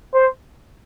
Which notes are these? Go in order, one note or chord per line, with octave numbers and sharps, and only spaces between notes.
C5